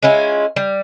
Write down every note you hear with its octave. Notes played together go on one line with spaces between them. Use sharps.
G#3 C#4 E4 F4
G3